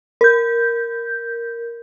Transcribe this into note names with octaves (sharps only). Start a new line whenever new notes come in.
A#4 G6